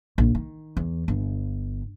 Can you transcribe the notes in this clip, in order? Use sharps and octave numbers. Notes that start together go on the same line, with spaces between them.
A#1
D#3
E2
G1